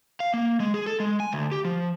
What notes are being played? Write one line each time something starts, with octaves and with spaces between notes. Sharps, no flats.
F5
A#3
G#3
G#4
A4
G#3
G#5
D2
G4
F3